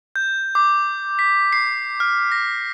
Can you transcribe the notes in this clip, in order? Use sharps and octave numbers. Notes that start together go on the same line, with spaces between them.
G6
D6
B6
C7
F6
A#6